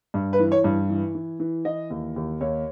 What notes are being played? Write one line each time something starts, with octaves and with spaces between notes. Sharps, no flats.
G2
B4
E3
C#5
G2
E3
E3
E3
E3 D#5
D#2
D#2
D#2 C#5